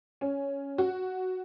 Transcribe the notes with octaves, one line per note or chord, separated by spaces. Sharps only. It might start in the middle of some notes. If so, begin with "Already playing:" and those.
C#4
F#4